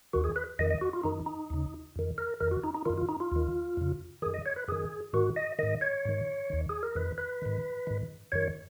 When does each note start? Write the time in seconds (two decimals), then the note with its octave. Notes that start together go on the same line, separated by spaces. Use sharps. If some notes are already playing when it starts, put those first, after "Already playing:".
0.13 D#2 D#3 F#4
0.24 G#4
0.36 B4
0.59 F2 D#3 D#5
0.70 D#5
0.81 F#4
0.93 F4
1.04 F#2 D#3 D#4
1.26 D#4
1.50 D#2 C#3
1.96 F2 D#3
2.18 A#4
2.40 F2 D#3 A#4
2.51 F#4
2.64 D#4
2.74 D#4
2.86 F#2 D#3 F4
2.98 F4
3.09 D#4
3.20 F4
3.32 D#2 D#3
3.77 F2 C#3
4.22 D#3 G#4
4.26 F#2
4.34 D#5
4.46 C#5
4.56 B4
4.68 F#2 D#3 G#4
5.13 G#2 D#3 F#4
5.36 D#5
5.59 G#2 D#3 D#5
5.81 C#5
6.05 G#2 D#3
6.50 D#2 D#3
6.69 G#4
6.83 A#4
6.95 F2 D#3 B4
7.18 B4
7.42 G#2 D#3
7.87 G#2 D#3
8.32 F#2 D#3 C#5